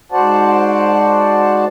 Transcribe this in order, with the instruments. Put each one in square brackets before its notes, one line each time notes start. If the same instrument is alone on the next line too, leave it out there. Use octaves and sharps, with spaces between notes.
[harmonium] G#2 F#4 C5 D5 F#5 A5